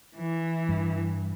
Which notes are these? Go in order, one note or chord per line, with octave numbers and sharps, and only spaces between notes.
E3
G2